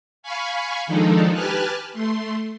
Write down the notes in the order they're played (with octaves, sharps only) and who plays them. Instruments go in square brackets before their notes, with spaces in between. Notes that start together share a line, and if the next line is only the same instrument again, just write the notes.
[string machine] F5 G#5 B5 C#6
D#3 F3 G#3 D4 D#4 A4
G4 B4 G#5 A5 F6 F#6
A3 C6